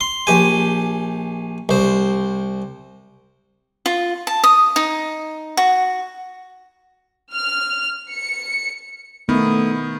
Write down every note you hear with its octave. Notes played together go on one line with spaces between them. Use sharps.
C6
A#1 G4 G#5
C2 C5
F4
A5
D#6
D#4
F#4
F6
C#7
D#3 A3 B3 E4 D#6